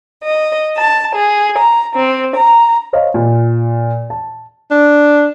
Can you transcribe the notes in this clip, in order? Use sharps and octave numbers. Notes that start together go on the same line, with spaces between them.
D#5
A5
G#4
A#5
C4
A#5
C5 C#5 D#5 F5
A#2
A5
D4